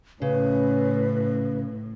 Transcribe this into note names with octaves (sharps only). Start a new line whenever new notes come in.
A2 C#3 C#4 B4